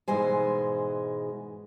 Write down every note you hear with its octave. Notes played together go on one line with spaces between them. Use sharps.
G#2 B2 E3 G#3 C5 G#5